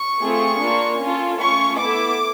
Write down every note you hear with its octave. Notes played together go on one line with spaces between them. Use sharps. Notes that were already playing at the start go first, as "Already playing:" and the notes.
Already playing: C#6
A3 C4 F4 G#4
A#3 D4 F4
C#4 F4 A4
A3 C#4 F4 C#6
B3 E4 A4 D6